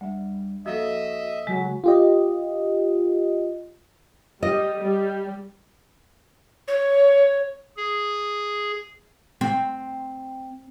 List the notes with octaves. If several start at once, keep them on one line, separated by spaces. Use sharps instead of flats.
D2 G3 E5
F3 A#3 F#4 A4 D#5 E5
C#3 F#3 G#3
F4 G4 D#5
G3 D#5
G3
C#5
G#4
C4